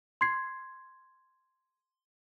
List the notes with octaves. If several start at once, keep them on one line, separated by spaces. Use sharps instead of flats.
C6 G#6 C7